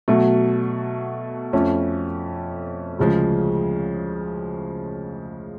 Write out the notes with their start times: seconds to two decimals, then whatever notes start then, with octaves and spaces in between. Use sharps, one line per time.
0.08 B2 F#3 A3
1.53 F2 F3 A3 C#4
2.99 D2 C#3 F3 G#3